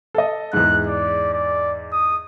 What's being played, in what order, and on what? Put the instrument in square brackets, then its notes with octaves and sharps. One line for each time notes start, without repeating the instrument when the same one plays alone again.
[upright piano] A4 D#5
[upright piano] E2 G#2 [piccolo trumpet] F#6
[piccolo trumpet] D5
D5
D#6